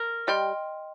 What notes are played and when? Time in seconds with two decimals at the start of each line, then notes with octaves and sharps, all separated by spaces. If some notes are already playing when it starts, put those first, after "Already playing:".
Already playing: A#4
0.27 G3 D#5 G5 C6 F6